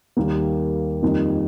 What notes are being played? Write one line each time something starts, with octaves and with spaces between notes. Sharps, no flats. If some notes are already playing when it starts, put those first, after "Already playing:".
D#2 D#3 G3 A#3
F2 D#3 G3 A#3 D#4